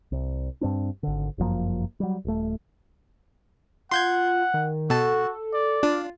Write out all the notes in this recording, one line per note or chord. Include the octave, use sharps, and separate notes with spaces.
C2
G2 C4 D4
G#1 D3
G1 F#2 F3 A#3
F#3 G3
D#1 A3
F4 F#5 C6 G6 G#6
D#3
B2 F#4 A4 A5
D5
D4 F4